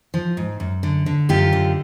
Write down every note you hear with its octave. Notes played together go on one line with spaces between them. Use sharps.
F3
G#2
F#2
D3
D3
F#2 F4 G4
D3